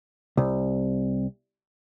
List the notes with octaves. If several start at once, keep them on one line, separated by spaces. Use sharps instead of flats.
C2